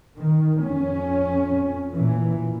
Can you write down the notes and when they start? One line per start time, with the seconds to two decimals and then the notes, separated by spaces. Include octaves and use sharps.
0.17 D#3
0.64 F2 C#4
1.93 A#2 E3